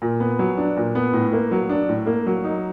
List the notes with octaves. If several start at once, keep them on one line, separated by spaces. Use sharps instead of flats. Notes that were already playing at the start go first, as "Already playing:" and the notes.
A#2
B3
F#3
D4
A#2
B3
A2
A#3
F#3
D4
A2
A#3
F#3
D#4